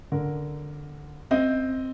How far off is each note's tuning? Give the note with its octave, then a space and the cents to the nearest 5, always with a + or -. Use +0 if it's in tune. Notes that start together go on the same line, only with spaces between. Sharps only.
D3 +0 A#4 +5
C4 +0 D#5 +5